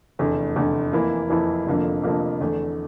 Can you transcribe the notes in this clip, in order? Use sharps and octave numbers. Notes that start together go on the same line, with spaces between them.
F1 E2 D3 A3
F1 E2 D3 A3
F2 E3 A#3 E4
F2 E3 A#3 E4
F1 F2 D3 F3 A#3
F1 F2 D3 F3 A#3
E2 D3 A3